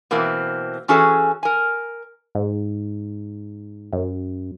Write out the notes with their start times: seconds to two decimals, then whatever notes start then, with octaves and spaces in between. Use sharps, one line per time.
0.11 B2 E3 A#3 C4
0.88 E3 C#4 F#4 G#4 A4 C#5
1.43 A#4 G#5
2.35 G#2
3.93 F#2